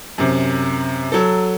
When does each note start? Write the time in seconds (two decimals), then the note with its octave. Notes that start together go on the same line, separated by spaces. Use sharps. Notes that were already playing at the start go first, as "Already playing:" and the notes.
0.18 F#2 C3
1.12 F#3 A4